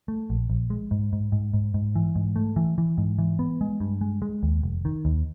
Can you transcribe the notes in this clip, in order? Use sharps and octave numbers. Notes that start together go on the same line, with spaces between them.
A3
A#1
A#1
G#3
G#2
G#2
G#2
G#2
G#2
E3
G#2
A3
E3
E3
G#2
E3
B3
G#3
G2
G#3
G#3
D#2
F1
D#3
D#2